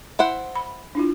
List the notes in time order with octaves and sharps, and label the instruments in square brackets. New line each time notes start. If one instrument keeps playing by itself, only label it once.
[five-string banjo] E4 C5 F#5
[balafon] B5
D4 E4 F4